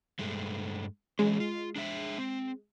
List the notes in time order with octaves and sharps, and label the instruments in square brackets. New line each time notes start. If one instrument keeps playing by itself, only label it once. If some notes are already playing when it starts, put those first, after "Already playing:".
[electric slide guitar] G2 G#3 A3
[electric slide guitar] E3 F#3 C#4 [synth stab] G#3
[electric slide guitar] F4
D4 G#4 E5
C4